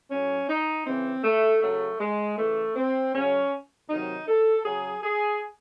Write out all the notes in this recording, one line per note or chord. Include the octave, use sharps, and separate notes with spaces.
A2 F#3 C#4
D#4
C#3 E3 C4
A3
C#3 F#3 A3
G#3
C#3 E3 A3
C4
C#3 F#3 C#4
C3 D#3 F#3 D#4
A4
C#3 F#3 G#4
G#4